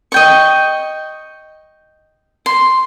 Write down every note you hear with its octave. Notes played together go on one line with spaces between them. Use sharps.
D#5 G5 C#6
C6